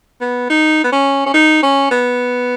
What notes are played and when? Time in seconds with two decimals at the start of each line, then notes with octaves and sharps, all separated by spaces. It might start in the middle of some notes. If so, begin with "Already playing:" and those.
0.21 B3
0.50 D#4
0.84 B3
0.92 C#4
1.26 C#4
1.34 D#4
1.63 C#4
1.91 B3